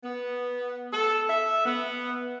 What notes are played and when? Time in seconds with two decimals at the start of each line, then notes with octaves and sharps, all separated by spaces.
0.04 B3
0.93 A4
1.28 E5
1.66 B3